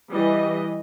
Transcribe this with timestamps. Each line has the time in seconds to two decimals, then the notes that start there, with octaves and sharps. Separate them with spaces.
0.10 E3 G3 D#5